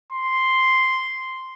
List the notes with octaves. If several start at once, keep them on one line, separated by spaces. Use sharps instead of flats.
C6